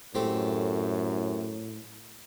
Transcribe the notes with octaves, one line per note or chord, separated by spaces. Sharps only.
F#2 A2 A3 C4 G4